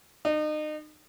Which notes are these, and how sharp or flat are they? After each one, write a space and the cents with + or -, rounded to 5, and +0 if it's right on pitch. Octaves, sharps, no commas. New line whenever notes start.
D#4 -35